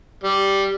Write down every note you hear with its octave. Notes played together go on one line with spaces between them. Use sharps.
G3